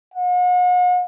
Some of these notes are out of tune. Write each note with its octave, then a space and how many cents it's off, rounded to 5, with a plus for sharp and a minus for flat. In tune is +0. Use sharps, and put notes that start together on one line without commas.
F#5 -45